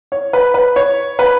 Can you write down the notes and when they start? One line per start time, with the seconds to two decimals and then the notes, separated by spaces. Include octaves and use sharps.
0.12 C#5
0.33 B4
0.54 B4
0.76 C#5
1.19 B4